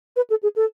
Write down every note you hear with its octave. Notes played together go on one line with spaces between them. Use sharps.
B4
A4
G#4
A4